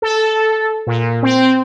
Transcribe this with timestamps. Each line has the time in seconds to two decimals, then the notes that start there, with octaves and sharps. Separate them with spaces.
0.02 A4
0.87 A#2
1.23 C4